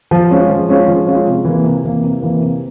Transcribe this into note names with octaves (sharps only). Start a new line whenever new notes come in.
F3
G#3 C#4 F4
F3
G#3 C#4 F4
F3
G#3 C#4 F4
C3
E3 A#3
C3
E3 A#3
C3
E3 A#3
C3